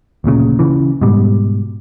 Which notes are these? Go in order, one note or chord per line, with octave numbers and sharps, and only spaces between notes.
D1 A1 A#2 C#3
C#3 E3
G#2 B2 G3